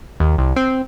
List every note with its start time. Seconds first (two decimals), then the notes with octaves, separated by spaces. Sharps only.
0.20 D#2
0.38 C2
0.56 C4